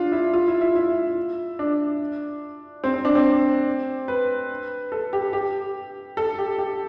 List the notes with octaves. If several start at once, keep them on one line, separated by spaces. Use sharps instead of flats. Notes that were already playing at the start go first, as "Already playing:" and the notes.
Already playing: D4 F4
E4
F4
E4
E4
E4
D4
C4
C4
D4
C4
B4
A4
G4
G4
A4
G4
G4